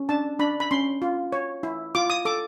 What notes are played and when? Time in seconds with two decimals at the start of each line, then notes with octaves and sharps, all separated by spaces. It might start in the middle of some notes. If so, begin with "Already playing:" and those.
Already playing: C#4
0.09 D4 A5
0.39 D4 B5
0.60 B5
0.71 C#4 C6
1.02 F4
1.32 C#5
1.63 E4
1.95 F4 D6
2.10 D#6
2.25 A4 D6